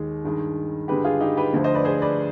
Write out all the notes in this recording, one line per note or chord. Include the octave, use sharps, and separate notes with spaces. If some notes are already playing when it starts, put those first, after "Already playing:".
Already playing: D#2 D#3 G#3
G2 D#3 G#3
G2 D3 G#3 G4 B4
F4 G#4
D#4 G4
G4 B4
D2 D3 F3
C5 D#5
B4 D5
G#4 C5
B4 D5